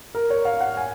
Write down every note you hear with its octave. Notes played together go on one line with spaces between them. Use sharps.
A#4
C#5
F5
F#5
G#5